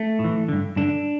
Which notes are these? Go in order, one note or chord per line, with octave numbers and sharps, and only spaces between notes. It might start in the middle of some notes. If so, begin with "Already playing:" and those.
Already playing: A3
A2
E3
G2 D3
G2 D3 D4